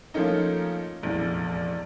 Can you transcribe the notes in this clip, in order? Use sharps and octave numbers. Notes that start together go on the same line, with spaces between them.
F3 A3 A#3 C#4 D#4
F1 A#1 E2